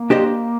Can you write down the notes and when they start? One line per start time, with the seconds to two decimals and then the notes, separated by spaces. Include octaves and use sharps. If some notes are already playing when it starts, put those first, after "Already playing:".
Already playing: A#3
0.10 D4 G4 C5 D#5